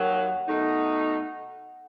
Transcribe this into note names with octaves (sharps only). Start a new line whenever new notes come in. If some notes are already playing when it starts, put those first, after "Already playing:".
Already playing: D#2 D#3 F#3 F#5
B2 A3 D#4